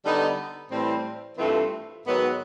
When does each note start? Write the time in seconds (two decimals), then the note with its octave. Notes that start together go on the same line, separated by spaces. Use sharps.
0.03 D3 G3 B3 D#4
0.70 A2 E3 G3 C4
1.37 G2 E3 A3 C4 F4
2.05 G#2 D#3 F#3 B3